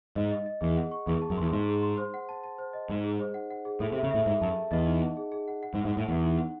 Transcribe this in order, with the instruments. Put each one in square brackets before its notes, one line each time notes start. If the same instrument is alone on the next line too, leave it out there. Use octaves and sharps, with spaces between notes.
[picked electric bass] G#2 [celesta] D#5
[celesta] D#5
D#5
[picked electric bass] E2 [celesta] G#4
[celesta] F#5
C#6
[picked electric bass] E2 [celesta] G#4
[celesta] A5
[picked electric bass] F#2
[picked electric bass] E2 [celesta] C6
[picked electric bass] G#2 [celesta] C6
[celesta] G#4
C6
C5
F#5
A5
A5
C5
D#5
[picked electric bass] G#2 [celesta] D#4
[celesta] G#4
C5
F#5
F#5
G#4
[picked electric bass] A2 [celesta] A4
[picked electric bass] C3
[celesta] E5
[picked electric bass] C#3
[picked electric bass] A2 [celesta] E5
[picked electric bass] G#2 [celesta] E5
[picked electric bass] F#2 [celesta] A5
[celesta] A5
[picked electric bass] E2 [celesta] D#5
[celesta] D#4
F#5
G#4
G#4
F#5
F#5
[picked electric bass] G#2
[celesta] F#5
[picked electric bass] G#2
[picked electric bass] A2 [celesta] F#5
[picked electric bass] E2 [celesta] F#5
[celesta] D#4
F#5